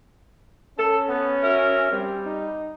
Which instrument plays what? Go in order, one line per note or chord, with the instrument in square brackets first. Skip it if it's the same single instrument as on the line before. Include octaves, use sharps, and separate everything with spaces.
[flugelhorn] C#4 [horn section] A4
[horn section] B3
F#4 A#4 E5
[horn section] G3 [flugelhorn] C4
[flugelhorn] D#4